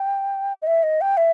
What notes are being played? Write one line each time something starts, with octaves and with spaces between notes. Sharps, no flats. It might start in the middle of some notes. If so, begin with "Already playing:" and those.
Already playing: G5
D#5
E5
D#5
G5
E5